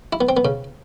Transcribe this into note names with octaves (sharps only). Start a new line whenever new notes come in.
E4
B3
C4
B3
C#3